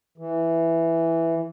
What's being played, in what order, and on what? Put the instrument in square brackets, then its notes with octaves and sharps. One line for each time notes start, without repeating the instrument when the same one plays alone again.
[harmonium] E3